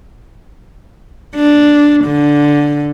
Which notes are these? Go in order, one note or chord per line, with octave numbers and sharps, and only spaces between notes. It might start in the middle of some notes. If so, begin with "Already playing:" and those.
D4
D3